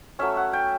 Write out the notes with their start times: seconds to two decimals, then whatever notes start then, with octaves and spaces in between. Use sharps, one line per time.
0.19 F#3 A3 C#4 E5
0.37 F#5
0.53 G5